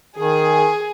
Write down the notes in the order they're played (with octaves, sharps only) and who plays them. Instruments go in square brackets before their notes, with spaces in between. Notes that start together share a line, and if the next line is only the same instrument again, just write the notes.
[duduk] D#3 [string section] G#4